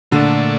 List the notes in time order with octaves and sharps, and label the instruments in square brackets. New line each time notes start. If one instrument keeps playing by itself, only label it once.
[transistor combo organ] A#2 A3 D4 [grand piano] D3